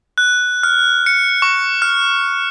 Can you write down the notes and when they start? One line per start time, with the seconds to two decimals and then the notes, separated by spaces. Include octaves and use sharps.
0.18 F#6
0.63 F6
1.06 C#7
1.42 C#6
1.82 F6